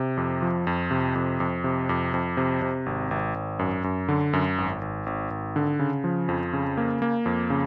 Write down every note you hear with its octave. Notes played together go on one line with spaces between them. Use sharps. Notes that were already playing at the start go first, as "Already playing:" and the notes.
Already playing: C3
F2
F3
F2
C3
F2
F2
C3
F2
F2
C3
C3
G#1
G#1
G#1
F#2
F#2
D3
F#2
G#1
G#1
G#1
G#1
D3
C#3
F3
F2
C#3
A#3
A#3
F2
C#3